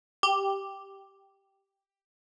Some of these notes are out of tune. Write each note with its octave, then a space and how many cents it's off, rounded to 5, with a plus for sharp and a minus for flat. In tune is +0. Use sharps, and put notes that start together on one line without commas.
G4 +0